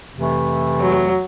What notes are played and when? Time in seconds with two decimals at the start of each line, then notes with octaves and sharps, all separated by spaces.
0.14 F2 C3 E3 A3
0.81 F#3